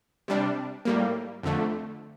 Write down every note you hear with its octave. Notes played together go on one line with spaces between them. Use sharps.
C3 G3 D4
A2 G3 A#3
F2 D3 A3